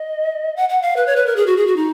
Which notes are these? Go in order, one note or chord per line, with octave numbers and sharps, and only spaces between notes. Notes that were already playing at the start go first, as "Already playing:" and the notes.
Already playing: D#5
F#5
F#5
F5
B4
C#5
B4
A#4
G#4
F#4
G#4
F#4
D#4